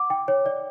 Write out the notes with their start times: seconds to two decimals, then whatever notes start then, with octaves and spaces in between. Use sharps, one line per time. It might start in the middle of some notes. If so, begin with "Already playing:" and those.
Already playing: F#5 D6
0.10 G5
0.28 C#5
0.46 D5